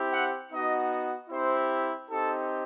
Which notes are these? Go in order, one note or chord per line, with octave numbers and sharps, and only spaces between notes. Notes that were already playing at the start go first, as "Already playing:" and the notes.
Already playing: C4 E4 G4
F#5
B3 D#4 F#4 D#5
C4 E4 G4 C5
C4 D#4 G4 A4